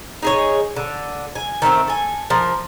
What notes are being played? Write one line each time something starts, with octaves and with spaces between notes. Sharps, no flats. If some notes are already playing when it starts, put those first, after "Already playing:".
D#4 G#4 C#5
D3
G#5
D#3 A3 B3 C4
A4 G#5
F3 A#4